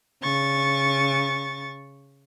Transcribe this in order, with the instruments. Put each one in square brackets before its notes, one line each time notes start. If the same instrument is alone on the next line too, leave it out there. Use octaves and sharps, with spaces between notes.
[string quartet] C#3 C#6 A6